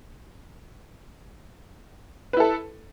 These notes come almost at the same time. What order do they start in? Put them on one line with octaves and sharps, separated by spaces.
B4 E4 A4